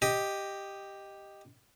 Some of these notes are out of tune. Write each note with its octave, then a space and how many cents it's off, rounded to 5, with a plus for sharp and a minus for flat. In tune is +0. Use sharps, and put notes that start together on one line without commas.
G4 +0 D#5 +0